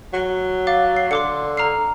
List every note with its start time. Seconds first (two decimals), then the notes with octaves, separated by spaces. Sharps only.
0.14 F#3
0.67 F5 D6 A6
0.97 C7
1.11 D3 C6 D6 C#7
1.57 A#5 F6 C7